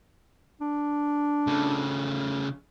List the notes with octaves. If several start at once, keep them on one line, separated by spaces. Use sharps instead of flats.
D4
C#3 A3